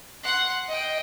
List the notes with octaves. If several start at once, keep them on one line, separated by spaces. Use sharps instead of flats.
F#5 C6
D#5 G5